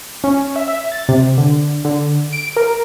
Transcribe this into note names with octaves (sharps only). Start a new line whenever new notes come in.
C#4
E5
E5
A6
C3
D3
D3
D7
A#4